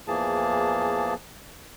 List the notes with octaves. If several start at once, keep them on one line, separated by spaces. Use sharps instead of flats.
E2 E3 F3 A#3 G#4 A5